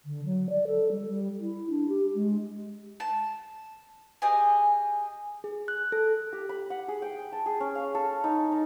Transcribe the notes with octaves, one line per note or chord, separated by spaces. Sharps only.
D3
F#3
D5
A4
G3
G3
E4
D4
G4
G#3
A5
G4 G#4 D#5 G#5
G#4
F#6
A4
G4
B5
F#5
G#4
G5
A5
G#4
C#4
F5
A4
D#4
D#4